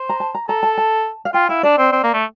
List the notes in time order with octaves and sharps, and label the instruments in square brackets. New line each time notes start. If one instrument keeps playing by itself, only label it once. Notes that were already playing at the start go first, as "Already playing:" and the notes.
Already playing: [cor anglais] C5
[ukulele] A#5
A5
A#5
[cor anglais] A4 [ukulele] A#5
[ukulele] A5
A5
F5
[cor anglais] F4 [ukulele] G5
[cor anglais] E4 [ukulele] F5
[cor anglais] D4 [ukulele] D5
[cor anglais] C4
C4
A#3
A3